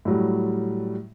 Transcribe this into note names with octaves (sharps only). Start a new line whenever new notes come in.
A2 F#3 G3